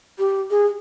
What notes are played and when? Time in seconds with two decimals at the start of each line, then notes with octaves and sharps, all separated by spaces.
0.18 G4
0.51 G#4